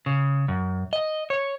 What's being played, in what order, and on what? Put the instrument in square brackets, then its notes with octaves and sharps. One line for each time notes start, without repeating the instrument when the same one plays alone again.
[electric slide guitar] C#3
F#2
D#5
C#5